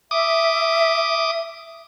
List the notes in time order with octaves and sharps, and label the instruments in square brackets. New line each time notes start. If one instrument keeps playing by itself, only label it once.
[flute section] E5 [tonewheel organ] D6 D#6